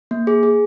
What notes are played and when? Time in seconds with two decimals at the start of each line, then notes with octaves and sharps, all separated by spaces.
0.11 A#3
0.27 G#4
0.43 G#4